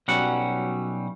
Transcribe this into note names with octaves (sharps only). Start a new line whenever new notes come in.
B1 F#3 G3 C#4 F#5